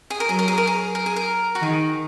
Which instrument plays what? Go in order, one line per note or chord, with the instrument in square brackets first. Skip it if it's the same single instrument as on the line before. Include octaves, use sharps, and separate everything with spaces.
[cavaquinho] G#4
A#4
[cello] F#3 [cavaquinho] G#4
[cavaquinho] A#4
G#4
A#4
G#4
A#4
G#4
A#4
F#4
[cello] D#3 [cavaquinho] G#4